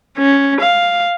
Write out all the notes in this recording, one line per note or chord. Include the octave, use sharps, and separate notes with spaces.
C#4
F5